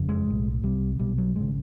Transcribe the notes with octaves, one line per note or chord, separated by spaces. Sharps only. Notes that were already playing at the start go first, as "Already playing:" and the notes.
Already playing: F#1 F2 C#3
G#3
B1 A2
C2 C3 G3
B1 B2 G3
F#3
G#1 C#3 G#3